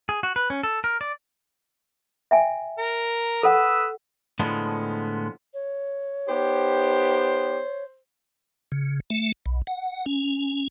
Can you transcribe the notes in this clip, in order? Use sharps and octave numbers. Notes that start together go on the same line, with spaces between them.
G#4
F#4
B4
C#4
A4
A#4
D5
E5 G5 G#5
A#4
A4 B4 F#5 D#6 E6
A2 D3 F3 G#3 B3
C#5
B3 D#4 G4 C5
C#3
A3
B1
F#5
C#4